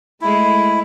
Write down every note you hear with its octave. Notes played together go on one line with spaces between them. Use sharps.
G#3 A3 E4